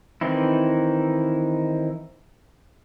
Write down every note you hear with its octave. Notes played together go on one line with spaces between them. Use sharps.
D#3 E3 C4 D#4 E4